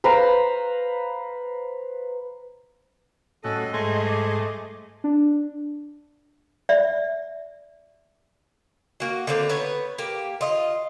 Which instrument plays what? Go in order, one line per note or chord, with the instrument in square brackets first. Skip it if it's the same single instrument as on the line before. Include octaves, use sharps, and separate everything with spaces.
[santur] B4 C5 F5 A#5
[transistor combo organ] A2 F#4 [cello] G3 D#5 [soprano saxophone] C#4 [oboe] A4
[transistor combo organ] G#2 G#4 C5 [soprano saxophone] A3 [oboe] C6
[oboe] D6
[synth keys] D4
[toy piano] D5 E5
[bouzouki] A#3 F#4
D3 A#3 C4
B3 B4 C#5
A#3 G4
F4 D#5